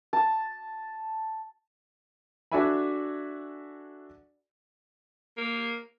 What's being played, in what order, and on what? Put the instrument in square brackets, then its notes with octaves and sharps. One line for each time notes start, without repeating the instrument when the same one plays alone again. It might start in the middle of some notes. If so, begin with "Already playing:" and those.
[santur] A5
[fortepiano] D4 F#4 A4 E5 G#5 B5
[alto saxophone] A#3